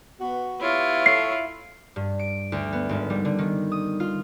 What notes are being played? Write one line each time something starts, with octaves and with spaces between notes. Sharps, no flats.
B3 F#4
B3 E4 F4 G4 C#5
A4 C#5 C7
G2
D7
D2
B3
G#1
G3
D3
D#3
D#6
F4